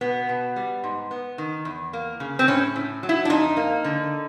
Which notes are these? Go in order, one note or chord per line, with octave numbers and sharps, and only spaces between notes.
B2 B3
B2
G3
G#2
B3
D#3
E2
A#3
C#3
C4
A2 C#4
A2
F#3
E4
D4
F2 D#4
A#3
D3